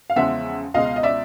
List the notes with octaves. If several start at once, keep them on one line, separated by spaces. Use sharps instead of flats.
F5
E2 C#3 F3 G#3 E5 F#5
C#2 B2 G#3 D#5 F5
D#5
D5 E5